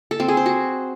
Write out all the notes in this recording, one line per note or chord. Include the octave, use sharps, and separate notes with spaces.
A4
C4
G#4
C5
F#4